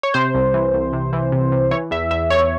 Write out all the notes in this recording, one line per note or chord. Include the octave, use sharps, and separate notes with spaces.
C#5
C3 C5
C2
E3
C2
C3
E3
C3
C3
E3 C#5
E2 E5
E2 E5
E2 C#5